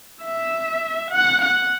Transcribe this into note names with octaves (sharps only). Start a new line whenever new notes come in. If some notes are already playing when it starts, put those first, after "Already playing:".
E5
F#5
F#5